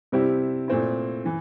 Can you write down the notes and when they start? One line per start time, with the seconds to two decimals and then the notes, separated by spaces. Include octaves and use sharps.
0.12 C3 G3 C4 E4 G4
0.68 A#2 A3 C4 E4
1.25 E3